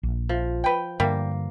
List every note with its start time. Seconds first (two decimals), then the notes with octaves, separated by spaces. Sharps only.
0.03 A#1
0.29 F3
0.64 B4 G5
1.00 G2 D3 G3 A#3